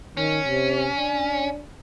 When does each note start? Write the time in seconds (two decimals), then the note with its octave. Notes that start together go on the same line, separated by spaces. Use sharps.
0.17 D#3 C#4
0.47 C3
0.97 D4